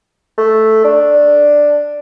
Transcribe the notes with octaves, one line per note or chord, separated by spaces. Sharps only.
A3
D4